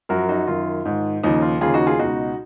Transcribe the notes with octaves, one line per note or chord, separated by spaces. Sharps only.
F#2 F3 F#4 A#4
D#4 F#4
F#2 D#3 F4
G#2 D#3
D#2 C#3 F3 D#4
F4
D#2 C#3 F3 F4 G#4
D#4 F#4
F4 G#4
C#2 B2 D#4 F#4